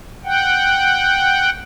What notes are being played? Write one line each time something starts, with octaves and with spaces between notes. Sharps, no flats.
F#5 G5